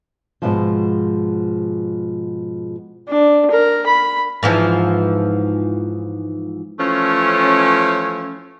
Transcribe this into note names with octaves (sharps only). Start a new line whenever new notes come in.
G#2 B2 F3
D4
A#4
B5
G#2 E3 F3
E3 F3 A3 C#4